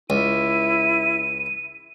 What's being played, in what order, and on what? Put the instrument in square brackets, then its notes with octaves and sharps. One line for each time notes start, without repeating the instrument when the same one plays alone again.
[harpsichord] C#2 [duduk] E4 [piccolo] D#7